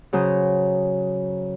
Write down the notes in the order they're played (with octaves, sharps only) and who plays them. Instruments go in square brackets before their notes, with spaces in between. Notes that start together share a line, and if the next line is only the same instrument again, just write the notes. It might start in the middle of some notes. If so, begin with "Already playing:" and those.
[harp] C#3 F#3 C5 D#6